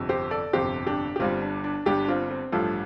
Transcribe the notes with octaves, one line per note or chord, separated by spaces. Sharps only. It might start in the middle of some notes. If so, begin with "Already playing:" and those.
Already playing: G1 F2 C3
G4 C5
A4 D5
G1 F2 C3 G4 C5
D4 G4
G4
G1 G2 G3 C4 F4
D4
D4
G1 G2 G3 D4 G4
D4
C4 F4
C4
A1 G2 F3 A3 F4 A4